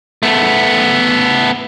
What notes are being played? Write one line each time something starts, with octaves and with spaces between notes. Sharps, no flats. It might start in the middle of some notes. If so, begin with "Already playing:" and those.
A3 B3